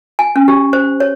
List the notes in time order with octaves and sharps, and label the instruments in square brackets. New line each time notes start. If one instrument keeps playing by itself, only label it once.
[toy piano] G#5
C#4
G4
C5
C#5